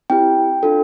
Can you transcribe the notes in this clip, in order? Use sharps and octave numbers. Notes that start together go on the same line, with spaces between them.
C4 E4 G4 G5
D4 F4 A4